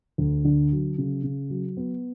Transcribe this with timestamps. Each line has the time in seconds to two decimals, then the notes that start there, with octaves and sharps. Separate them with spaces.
0.18 D2
0.45 D3
0.72 F#3
0.98 C#3
1.24 C#3
1.50 F#3
1.77 B3